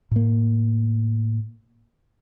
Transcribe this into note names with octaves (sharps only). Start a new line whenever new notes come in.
A2 A#3